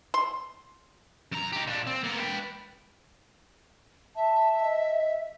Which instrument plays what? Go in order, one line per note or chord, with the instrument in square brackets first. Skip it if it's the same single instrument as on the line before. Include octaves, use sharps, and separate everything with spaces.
[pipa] C6
[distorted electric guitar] F#2 A#5
D#4 G4
A#2 D4
C4
A#3 B3
B4 G5
[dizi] E5 [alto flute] A5
[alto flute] D#5